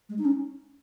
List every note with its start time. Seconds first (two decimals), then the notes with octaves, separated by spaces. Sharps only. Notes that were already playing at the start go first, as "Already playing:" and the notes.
0.09 G#3
0.18 D#4
0.25 C#4